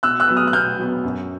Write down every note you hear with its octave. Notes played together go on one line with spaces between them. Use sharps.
B2 E6 F#6
E6 F#6
F#3 B3
D#6 F6
F#6
B2 F6 G6
F#3 B3
F#2